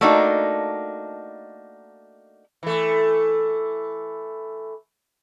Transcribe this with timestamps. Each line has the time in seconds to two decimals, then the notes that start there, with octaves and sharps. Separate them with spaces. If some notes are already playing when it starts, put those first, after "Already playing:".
0.01 A3 A#3 D4 D#4 F#4
2.63 E3 A3